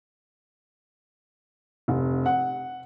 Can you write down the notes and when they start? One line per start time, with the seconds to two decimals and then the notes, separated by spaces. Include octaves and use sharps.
1.88 F1
2.26 F#5